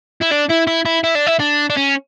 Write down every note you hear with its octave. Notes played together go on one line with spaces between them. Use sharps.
E4
D4
E4
E4
E4
E4
D4
E4
D4
D4
C#4